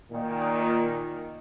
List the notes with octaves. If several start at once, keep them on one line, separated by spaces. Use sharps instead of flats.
A#2 D#3